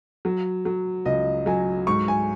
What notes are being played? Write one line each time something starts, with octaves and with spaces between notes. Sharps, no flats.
F#3
F#3
C#2 D#5
F#3 G#5
G#2 C#6
G#5